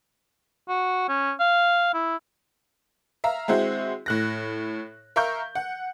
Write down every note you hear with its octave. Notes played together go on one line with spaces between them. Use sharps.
F#4
C#4
F5
E4
E5 F5 A#5
G#3 C4 E4 F#4
A2 F#6 A#6
A#4 E5 F5 C#6 G6
F#5